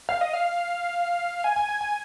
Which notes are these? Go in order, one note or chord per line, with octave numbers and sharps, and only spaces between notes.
F5
D#5
F5
G#5
G#5
G#5
G#5